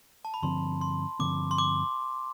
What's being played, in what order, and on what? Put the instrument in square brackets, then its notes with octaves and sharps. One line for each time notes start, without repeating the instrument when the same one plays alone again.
[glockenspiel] A5
B5
[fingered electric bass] G2 D3 F3 C4 [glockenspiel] C6
[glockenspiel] C6
[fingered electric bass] G2 D3 F3 C4 [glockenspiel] D6
[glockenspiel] C6
D6